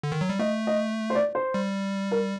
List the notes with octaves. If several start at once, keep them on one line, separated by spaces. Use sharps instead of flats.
D3
D#3
F#3
G3
A3 D#5
D#5
C5
D5
C5
G3
A#4